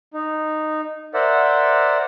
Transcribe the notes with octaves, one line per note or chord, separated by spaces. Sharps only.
D#4
A#4 C5 D5 E5 F#5